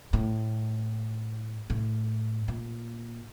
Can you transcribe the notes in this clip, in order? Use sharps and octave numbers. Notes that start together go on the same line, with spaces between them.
A2
A2
A#2